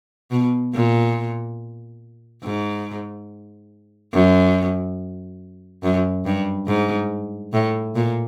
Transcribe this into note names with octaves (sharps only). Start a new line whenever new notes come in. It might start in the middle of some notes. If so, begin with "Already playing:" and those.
B2
A#2
G#2
F#2
F#2
G2
G#2
A2
A#2